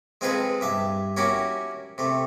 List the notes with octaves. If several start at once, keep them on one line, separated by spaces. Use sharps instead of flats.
G#3 C4 F4 G#4 A4 B4
G2 E5 A5
C#4 E4 F#4 G4 A#4 C#5
C3 A3